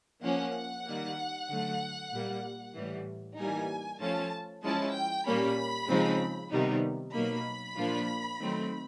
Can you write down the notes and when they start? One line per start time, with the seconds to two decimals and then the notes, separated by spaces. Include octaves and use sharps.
0.23 F3 A#3 C#4 F#5
0.86 D#3 G3 A#3
1.48 D3 F#3 A3
2.11 A#2 G3 A#3
2.75 A2 E3 G3
3.37 E3 G3 A#3 D#4 G#5
4.00 F3 A3 C#4 F4 A5
4.62 F3 G#3 C#4 E4 A5
4.94 G5
5.26 A#2 G3 A#3 C#4 B5
5.88 C#3 F3 G#3 C4 D#4
6.51 C3 D#3 G3 B3 D#4
7.14 B2 F#3 A#3 D#4 B5
7.77 A#2 F3 A#3 D4 F4
8.40 D#3 F#3 A3 C4